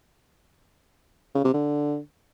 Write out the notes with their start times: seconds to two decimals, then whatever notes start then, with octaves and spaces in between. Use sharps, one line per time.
1.35 C#3
1.44 C3
1.54 D3